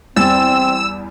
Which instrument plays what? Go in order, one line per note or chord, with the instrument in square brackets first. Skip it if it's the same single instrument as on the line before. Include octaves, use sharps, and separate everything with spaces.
[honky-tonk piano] E2 G3 A6 [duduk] C4 [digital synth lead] E6